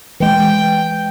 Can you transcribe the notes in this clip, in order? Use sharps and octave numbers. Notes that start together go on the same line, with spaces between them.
E3 G#3 G5